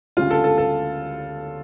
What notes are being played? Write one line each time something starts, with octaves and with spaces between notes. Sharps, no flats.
D2 C#3 G3 F4
A4
A4
A4